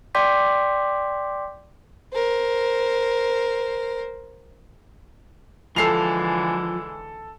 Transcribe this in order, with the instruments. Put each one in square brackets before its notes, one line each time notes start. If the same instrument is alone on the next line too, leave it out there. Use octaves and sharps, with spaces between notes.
[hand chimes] D5 G5 C6 D6 G6 B6
[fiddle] A#4 C5
[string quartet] D3 E3 G#3 [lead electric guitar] F3 [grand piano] A4 C7 F7